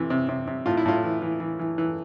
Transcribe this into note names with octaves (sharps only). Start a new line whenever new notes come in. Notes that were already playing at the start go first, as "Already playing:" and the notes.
Already playing: C3 E3
C3
C3
C3
A2 F4
E4
A2 F4
E3
E3
E3
E3
E3